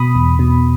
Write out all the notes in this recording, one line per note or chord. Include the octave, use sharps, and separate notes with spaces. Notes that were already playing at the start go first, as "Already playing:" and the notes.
Already playing: B2 B5 D#6
E2
B2